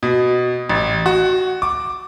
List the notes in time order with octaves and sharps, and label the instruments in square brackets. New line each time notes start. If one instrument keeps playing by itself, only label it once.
[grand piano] B2
A1
F#4
D6